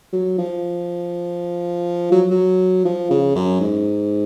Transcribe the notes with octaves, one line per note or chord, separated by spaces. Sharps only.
F#3
F3
F#3
F#3
F3
C#3
F#2
G#2